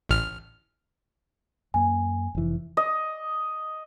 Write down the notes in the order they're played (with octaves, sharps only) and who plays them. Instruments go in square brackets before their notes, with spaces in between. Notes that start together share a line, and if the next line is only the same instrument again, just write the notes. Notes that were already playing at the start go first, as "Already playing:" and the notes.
[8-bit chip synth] A1 F6
[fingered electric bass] F#2 A#3 [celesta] G#5
[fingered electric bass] F1 E3
[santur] D#5